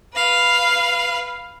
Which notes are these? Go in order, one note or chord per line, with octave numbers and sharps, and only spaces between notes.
B4 F5